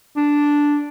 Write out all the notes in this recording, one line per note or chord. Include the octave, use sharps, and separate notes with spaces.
D4